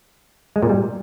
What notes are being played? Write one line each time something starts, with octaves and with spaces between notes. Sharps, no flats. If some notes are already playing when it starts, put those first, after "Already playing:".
G#3
A#2
G3